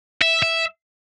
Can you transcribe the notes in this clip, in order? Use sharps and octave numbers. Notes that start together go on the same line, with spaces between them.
E5
E5